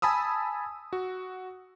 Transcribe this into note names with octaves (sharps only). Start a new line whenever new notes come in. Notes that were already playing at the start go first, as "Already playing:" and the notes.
G#5 A5 B5 D#6 E6
F#4